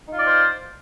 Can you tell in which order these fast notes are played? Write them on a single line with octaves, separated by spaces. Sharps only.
D#4 F4 D5 C5 F5